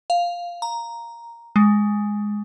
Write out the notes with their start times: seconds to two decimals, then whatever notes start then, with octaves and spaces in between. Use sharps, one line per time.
0.10 F5
0.62 A#5
1.56 G#3